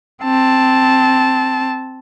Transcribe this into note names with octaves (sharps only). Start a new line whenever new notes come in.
C4 A5